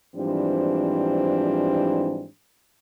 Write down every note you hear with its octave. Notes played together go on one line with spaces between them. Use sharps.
G#2 E3 F3 G3 C4 D4